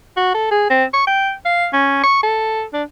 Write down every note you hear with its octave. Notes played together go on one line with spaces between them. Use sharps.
F#4
A4
G#4
C4
C#6
G5
F5
C#4
C#6
A4
D4